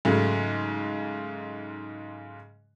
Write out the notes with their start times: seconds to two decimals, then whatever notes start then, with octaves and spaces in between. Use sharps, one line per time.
0.05 G#2 C#3 F#3 G#3 A3